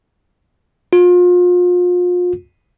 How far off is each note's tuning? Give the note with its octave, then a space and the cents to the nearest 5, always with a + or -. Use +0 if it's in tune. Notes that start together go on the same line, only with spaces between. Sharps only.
F4 +35